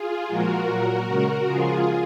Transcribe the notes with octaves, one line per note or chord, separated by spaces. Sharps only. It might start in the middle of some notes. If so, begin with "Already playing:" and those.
Already playing: F4 G#4
A#2 F3 G#3 F#4 A#4
A#2 F#3
C#3 G#3
C#3 F3 G#3 F4 G#4